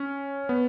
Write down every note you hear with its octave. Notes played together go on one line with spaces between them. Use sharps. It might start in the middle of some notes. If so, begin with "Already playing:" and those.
Already playing: C#4
B3